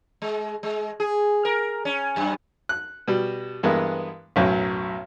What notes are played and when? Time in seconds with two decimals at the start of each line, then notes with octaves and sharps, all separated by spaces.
0.22 G#3
0.63 G#3
1.00 G#4
1.45 A#4
1.85 C#4
2.16 F#2
2.69 F#6
3.08 B2 G3
3.63 G2 E3 G#3 A#3 B3
4.36 B1 F#2 A2 F#3